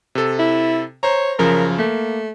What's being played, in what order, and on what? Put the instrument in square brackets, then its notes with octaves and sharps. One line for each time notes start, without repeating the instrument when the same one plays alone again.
[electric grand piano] C3 A4
[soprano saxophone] E4
[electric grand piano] C5 A#5 [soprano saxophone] C#5
[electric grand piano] F#2 C#3 F3 [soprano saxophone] A#4
[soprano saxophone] A3 [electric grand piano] A#3